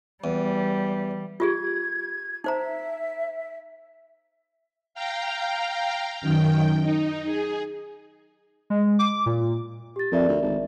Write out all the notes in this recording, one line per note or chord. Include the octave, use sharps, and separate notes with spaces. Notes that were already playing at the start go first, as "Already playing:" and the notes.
E2 G3
F4 G4 G#4 G#6
D#4 C5 E5 A#5
F5 G5 A#5
F#2 D#3 G5
D#4
G#4
G#3
D6
A#2
G4 A6
F2 A#4 D5 E5
D2
G#1